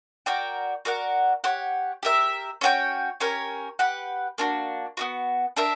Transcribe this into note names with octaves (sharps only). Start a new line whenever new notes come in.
F#4 A#4 D5 G5
F#4 A#4 D5 F#5
G4 C#5 F#5
G4 A#4 E5
C#4 F#4 C#5 G5
C#4 G4 A#4 C#5
G4 B4 F#5
A#3 D4 F#4
B3 D4 F#4
D4 A#4 E5